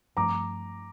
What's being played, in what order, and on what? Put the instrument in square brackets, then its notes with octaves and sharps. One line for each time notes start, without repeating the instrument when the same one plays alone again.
[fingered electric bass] G2 F3 A3 C4 [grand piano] A#5 D6